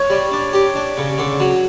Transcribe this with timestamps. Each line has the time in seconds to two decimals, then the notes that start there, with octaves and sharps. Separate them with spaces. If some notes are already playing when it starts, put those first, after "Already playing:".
Already playing: C#5
0.10 G3
0.31 D4
0.53 G4
0.75 D4
0.97 C#3
1.18 D3
1.40 F#3